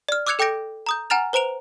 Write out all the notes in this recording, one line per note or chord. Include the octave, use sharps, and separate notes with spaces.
D5 F6
D6 E6 F#6 G#6 C#7 F7
A4 G5 D6 G6 A#6 D7
A#5 D#6 G6
F#5 G#5 A#5 F6 A6 F7
B4 C5 A#5 D7 F7